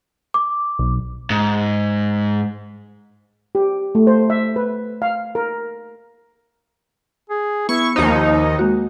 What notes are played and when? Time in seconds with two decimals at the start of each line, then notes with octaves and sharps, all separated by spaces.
0.34 D6
0.79 B1
1.30 G#2
3.55 G4
3.95 A3
4.07 C5
4.30 E5
4.56 B4
5.02 F5
5.35 A#4
7.30 G#4
7.69 B3 E4 C#6
7.96 D#2 F3 D#4 C5 D#5 C#7
8.59 G#3 A#3 F#4